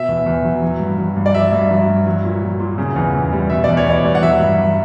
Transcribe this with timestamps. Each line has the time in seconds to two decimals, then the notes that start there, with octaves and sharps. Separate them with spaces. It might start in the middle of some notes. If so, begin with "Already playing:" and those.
Already playing: B2 E5
0.09 E2
0.26 E2
0.44 F#3
0.62 F#3
0.80 G2
0.98 F#3
1.16 G2
1.26 D5
1.34 F#3 E5
1.52 G2
1.71 F#3
1.88 G2
2.06 F#3
2.24 A#2
2.42 F#3
2.60 A#2
2.78 C#3
2.96 E2
3.14 E2
3.33 G3
3.50 B2 E5
3.64 E2 D5
3.77 C#5
3.86 E2 D5
4.05 G3
4.15 F#5
4.22 F#3 E5
4.40 G2
4.59 F#3